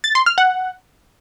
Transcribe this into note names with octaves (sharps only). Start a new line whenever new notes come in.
A6
C6
F6
F#5